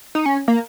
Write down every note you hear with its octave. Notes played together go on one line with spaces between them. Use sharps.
D#4
C#4
A#3